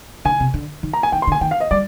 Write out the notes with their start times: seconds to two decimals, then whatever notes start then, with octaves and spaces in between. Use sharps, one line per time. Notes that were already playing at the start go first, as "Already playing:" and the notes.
0.25 D3 G#5
0.40 C3
0.54 D3
0.83 D#3
0.93 A#5
1.03 G#5
1.12 D#3 G5
1.22 C6
1.27 D3
1.32 G#5
1.41 D#3 G5
1.51 F5
1.60 D#5
1.71 G3 D5